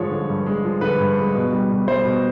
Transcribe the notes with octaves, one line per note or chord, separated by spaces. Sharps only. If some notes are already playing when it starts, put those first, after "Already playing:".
Already playing: G2 D3 F3 G#3 C#5
D3
G2
G#3
F3
D3 B4
G2
G#3
B2
G3
B2
G3 C5
B2